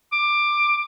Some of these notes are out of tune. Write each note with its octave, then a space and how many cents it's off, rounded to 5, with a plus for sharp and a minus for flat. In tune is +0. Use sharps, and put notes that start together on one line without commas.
D6 +15